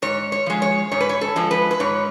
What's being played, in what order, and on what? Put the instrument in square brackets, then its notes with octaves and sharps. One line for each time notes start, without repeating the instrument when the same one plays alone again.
[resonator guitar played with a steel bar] G#2 C#5
C#5
F3 G#3
C#5
G#2 C#5
B4
C#5
A4
F3 G#3
B4
B4
G#2 C#5